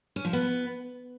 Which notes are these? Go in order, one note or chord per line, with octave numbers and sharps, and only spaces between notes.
C#4
F3
B3